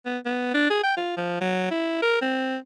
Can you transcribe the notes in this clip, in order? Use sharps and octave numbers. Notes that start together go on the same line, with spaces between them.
B3
B3
D4
G#4
G5
F4
F3
F#3
E4
A#4
C4